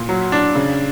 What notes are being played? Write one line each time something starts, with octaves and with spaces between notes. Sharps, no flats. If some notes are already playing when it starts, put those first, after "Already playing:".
Already playing: A#2
F#3
D4
C#3